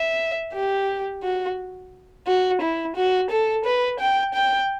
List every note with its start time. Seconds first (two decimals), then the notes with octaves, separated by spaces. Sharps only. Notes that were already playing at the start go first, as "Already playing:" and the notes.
Already playing: E5
0.54 G4
1.24 F#4
2.27 F#4
2.61 E4
2.96 F#4
3.31 A4
3.65 B4
3.99 G5
4.34 G5